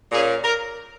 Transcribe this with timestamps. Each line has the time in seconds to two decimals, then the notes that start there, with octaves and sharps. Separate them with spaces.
0.11 A#2 A#3 C#4 G#4
0.43 A#4